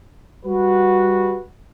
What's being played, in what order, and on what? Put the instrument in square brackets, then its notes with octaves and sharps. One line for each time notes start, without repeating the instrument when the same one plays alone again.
[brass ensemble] G3 F#4 B4